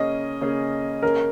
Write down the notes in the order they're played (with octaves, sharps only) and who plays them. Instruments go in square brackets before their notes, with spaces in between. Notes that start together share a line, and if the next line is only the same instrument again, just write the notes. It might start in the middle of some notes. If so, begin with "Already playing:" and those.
Already playing: [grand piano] C#3 A#3 C#4 G#4 [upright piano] D#5
[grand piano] C#3 A#3 C#4 G#4
[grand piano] C#3 A#3 C#4 G#4 [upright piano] A#4